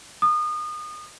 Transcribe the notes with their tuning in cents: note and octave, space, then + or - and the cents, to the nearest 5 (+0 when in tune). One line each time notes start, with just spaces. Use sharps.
D#6 -30